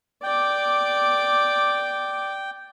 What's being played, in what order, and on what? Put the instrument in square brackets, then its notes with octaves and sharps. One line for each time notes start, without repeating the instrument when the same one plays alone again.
[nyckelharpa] D5 D6 [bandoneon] G5